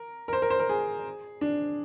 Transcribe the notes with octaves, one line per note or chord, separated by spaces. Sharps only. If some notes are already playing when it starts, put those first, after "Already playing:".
Already playing: A#4
A#4
C5
A#4
C5
A#4
G#4
D4